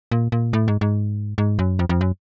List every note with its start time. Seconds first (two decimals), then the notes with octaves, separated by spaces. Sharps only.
0.12 A#2
0.32 A#2
0.53 A2
0.68 G#2
0.81 G#2
1.38 G#2
1.59 F#2
1.79 F2
1.89 F2
2.01 F#2